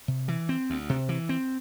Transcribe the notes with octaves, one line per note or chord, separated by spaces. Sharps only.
C3
E3
C4
D2
C3
E3
C4